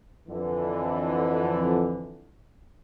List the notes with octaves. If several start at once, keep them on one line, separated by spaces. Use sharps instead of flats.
F2 D3 E3